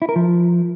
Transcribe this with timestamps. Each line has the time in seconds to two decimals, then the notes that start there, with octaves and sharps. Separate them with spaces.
0.02 E4
0.09 A#4
0.16 F3